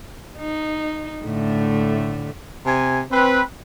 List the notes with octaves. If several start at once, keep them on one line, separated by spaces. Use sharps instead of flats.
D#4
A2 D3 A3
C3 G#5
C4 B4